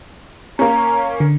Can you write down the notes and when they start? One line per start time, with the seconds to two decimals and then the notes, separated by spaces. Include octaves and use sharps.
0.59 A#3 C#4 A#5
1.20 D3